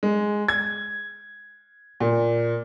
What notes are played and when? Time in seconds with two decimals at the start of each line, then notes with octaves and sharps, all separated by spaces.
0.03 G#3
0.48 G#6
2.00 A#2